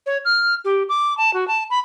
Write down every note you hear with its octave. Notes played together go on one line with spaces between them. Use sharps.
C#5
F6
G4
D6
A5
F#4
A5
B5